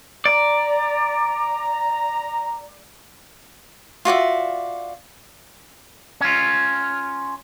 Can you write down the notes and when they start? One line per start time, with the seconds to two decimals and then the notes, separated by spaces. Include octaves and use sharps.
0.26 D5 A#5
4.05 F4 F#4 D5 E5
6.21 C#4 F4